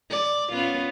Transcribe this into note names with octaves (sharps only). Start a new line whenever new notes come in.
D5
B3 C#4 F4